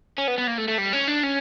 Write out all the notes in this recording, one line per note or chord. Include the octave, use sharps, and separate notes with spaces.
C#4
B3
B3
A#3
A3
A3
G3
C#4
D4
C#4